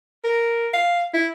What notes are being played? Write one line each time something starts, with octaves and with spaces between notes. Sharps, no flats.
A#4
F5
E4